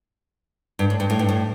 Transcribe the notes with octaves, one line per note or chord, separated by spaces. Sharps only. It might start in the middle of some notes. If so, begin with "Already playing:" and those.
G2
A2
G2
A2
G2
A2